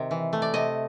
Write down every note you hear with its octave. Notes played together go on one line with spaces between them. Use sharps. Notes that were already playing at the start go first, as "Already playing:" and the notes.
Already playing: C3 D#3
E3
A3
D5
C3 D#5